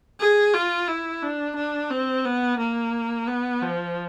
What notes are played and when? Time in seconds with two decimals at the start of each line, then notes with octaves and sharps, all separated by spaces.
0.20 G#4
0.54 F4
0.88 E4
1.22 D4
1.56 D4
1.90 C4
2.25 B3
2.59 A#3
3.27 B3
3.62 F3